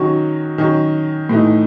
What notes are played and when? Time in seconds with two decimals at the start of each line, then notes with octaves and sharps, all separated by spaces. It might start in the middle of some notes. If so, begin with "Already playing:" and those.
Already playing: D#3 F#3 C#4 F#4
0.58 D#3 F#3 C#4
1.29 A2 E3 A3 D#4